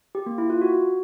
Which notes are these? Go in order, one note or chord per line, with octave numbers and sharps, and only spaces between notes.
G4
A#3
E4
F4
F#4